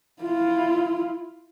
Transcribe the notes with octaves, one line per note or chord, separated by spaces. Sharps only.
E4 F4